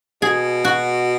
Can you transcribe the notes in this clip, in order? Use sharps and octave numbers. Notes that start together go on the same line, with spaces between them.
B2 G#4
F#4